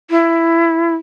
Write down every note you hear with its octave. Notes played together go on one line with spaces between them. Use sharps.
E4